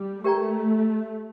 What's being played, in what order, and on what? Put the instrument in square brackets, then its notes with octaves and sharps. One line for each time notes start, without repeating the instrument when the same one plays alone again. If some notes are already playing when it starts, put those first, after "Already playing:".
Already playing: [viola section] G3
[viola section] A3 [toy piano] G4 A#4 D5 G5 A#5